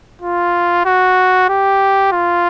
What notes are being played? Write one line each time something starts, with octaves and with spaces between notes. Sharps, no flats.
F4
F#4
G4
F4